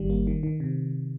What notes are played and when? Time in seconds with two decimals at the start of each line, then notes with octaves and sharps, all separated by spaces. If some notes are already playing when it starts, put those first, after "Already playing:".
Already playing: G1 D#3 G3
0.10 A#3
0.27 D#3
0.43 D#3
0.60 C3